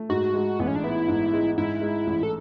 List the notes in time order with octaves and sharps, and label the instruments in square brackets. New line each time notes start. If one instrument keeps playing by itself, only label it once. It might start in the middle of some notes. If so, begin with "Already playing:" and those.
Already playing: [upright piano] A3
[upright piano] G#2 [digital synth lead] F#4
[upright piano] G#3
[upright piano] A1 [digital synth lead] B3
[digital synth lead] C#4
D4
[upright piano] B3 [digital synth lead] E4
[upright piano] G#2
G#3
[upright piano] G#2 [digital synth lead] E4
[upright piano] G#3
A1
[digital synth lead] A4